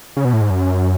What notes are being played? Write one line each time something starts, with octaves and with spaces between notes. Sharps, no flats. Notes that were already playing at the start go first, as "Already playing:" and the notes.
C#3
B2
A2
G#2
F#2